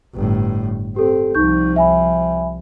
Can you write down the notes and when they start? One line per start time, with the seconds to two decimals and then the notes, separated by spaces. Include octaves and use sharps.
0.15 G1 A2
0.96 C4 G4 A4
1.35 C2 F3 D#4 C#6 G6
1.76 E5 G#5 B5